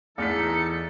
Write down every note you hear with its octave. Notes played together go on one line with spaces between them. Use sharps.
E2 E3 D#4 A4 F6 B6 C#7